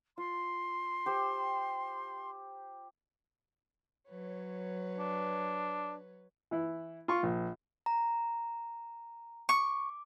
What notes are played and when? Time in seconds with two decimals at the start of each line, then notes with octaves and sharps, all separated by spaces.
0.18 F4 C6
1.06 G4 C5 G5
4.09 F#3 B4 C#5
4.99 D4
6.51 E3 E4
7.08 F4 C6 C#6
7.23 A#1
7.86 A#5
9.49 C#6 D6